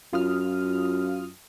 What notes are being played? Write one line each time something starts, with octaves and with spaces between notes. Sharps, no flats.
F#2 F4 D#6 F6